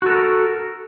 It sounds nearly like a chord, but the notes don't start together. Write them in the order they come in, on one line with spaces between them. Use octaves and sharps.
F#4 A4 A#4